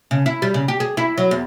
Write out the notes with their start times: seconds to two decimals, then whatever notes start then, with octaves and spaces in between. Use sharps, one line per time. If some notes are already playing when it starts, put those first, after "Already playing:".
0.11 C#3
0.26 E4
0.42 G3
0.54 C#3
0.68 G4
0.80 G#4
0.97 E4
1.18 F#3
1.31 E2